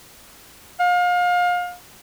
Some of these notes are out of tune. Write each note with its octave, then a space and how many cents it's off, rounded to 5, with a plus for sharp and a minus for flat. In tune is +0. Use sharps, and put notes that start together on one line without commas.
F5 +30